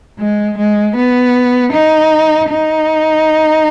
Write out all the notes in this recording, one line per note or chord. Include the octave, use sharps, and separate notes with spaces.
G#3
G#3
B3
D#4
D#4